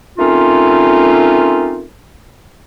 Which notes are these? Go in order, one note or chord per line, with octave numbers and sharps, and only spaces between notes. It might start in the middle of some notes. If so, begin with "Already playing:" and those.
A3 A#3 C4 C#4 D#4 F4